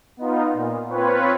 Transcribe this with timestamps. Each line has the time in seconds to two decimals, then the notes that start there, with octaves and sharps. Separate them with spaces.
0.17 B3 D#4 F4
0.53 A#2
0.89 C4 F4 B4 C#5